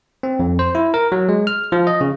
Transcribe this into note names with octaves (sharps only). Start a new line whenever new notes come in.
C4
F2
C5
E4
A#4
F#3
G#3
F6
F3
D#5
C#3